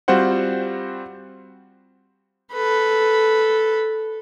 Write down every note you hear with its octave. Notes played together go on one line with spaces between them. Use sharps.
G3 C4 F4 F#4 C5 F#5
A4 B4